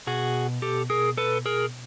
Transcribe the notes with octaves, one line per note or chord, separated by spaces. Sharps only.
B2 F#4 G#4
G4 A4
G#4 A#4
A4 B4
G#4 A#4